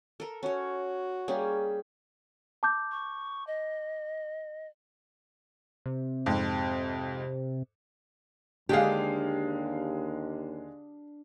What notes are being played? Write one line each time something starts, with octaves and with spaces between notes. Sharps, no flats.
A4 A#4
C#4 F#4 C#5
G3 A#3 C#4 G#4 G5
A5 D6 G6
C#6
D#5
C3
F2 G#2
D#2 D3 G#3 D4 G4 G#4 F5